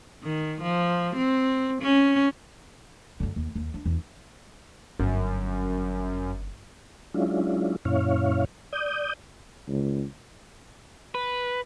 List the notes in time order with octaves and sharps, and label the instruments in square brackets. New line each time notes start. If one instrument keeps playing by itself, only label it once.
[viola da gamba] D#3
F3
C4
C#4
[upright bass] F#2 D3
D#2
D#2
D4
E2
[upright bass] G1 [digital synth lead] F#2
[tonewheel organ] F#3 G#3 C#4 D4 E4 F4
F#2 A#2 C#4 E4 C#5 F5
D5 D#6 G6
[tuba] C#2
[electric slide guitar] B4